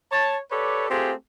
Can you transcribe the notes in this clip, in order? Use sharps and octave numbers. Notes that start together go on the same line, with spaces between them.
C#5 A5
G4 A4 B4 C#5 D5
A3 C4 F4 G4 G#4